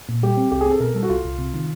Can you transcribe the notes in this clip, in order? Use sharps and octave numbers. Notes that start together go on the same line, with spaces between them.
A#2
G3 G4
C4
C2 G4
G#4
C4 A4
B2 A#4
G3 A4
F#4
C2 F4
C2
C3
D#3